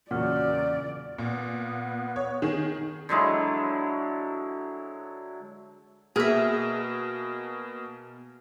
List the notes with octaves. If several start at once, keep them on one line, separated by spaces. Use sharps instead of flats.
E2 A#2 C#3 F#3 C#4 D5 F#5 F6
A#2 B3
C#5
D#3 G#4
D3 F#3 G#3 E4
B2 A#3 G#4 E5 F6